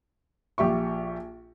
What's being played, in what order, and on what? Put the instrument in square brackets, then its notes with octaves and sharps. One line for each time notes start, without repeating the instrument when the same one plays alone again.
[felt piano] A#1 G4 E5 C#6